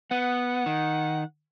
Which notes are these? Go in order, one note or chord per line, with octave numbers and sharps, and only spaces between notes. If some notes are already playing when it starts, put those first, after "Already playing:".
B3 F#5
D#3